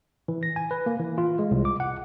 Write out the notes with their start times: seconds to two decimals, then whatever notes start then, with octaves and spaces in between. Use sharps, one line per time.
0.28 E3
0.43 A#6
0.56 G#5
0.71 B4
0.86 A#3
1.00 E3
1.18 F4
1.39 G#3
1.51 C2
1.65 D6
1.80 F#5